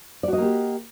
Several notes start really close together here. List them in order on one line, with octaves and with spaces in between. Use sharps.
D5 F#4 D#5 A#3 G4